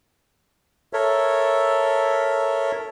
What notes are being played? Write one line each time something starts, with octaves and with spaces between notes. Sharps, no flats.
A4 A#4 C#5 E5